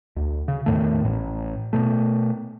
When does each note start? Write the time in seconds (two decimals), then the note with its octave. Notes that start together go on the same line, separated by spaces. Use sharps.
0.16 D2
0.48 C#3
0.66 E2 A2 D#3 A3
1.05 A1
1.73 B2 A3